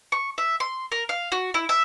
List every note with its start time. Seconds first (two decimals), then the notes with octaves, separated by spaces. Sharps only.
0.12 C#6
0.38 E5
0.60 C6
0.92 A#4
1.09 F5
1.32 F#4
1.54 E4
1.69 E5